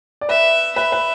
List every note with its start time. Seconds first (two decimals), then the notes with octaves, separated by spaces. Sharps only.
0.21 D5
0.29 B4 E5
0.76 B4 E5
0.92 B4